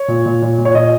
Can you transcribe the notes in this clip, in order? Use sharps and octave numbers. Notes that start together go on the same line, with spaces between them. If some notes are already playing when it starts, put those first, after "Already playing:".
Already playing: C#5
A#2
A#2
A#2
A#2
C#5
A#2 D#5